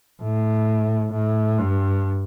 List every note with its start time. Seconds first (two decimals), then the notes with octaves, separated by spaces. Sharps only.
0.22 A2
1.12 A2
1.58 G2